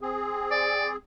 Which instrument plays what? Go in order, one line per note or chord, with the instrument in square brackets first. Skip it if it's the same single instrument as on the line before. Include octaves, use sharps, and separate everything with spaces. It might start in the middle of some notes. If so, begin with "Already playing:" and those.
[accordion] C4 G#4
[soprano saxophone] D5